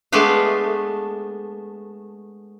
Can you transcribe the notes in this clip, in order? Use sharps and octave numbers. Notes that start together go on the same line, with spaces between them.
G#3 A3 B3 D4 B4 F5